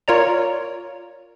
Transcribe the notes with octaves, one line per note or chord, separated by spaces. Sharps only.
F4 A#4 C#5 D5 A#5